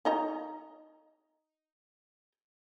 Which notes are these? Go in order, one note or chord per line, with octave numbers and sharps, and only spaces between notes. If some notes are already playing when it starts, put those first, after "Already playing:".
D#4 D#5 A#5